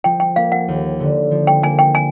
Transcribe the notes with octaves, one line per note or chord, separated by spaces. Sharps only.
F3 G5
G5
A#3 F5
F#5
D#2
D3
F3
G5
A#3 G#5
G5
G#5